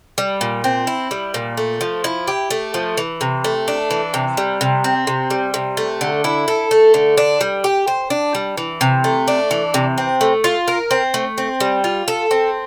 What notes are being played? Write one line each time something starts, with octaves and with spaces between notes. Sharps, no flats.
G3
A#2
C4
E4
G3
A#2
A3
F3
E4
G4
A3
F3
E3
C3
A3
D4
E3
C3
G3
C3
C4
C3
G3
C3
A3
D3
E4
A4
A3
D3
D4
G3
G4
C5
D4
G3
E3
C3
A3
D4
E3
C3
C4
A3
F4
A#4
C4
A3
C4
G3
F4
A4
C4